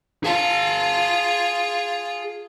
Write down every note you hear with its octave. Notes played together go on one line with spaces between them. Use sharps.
F4 G#4 A5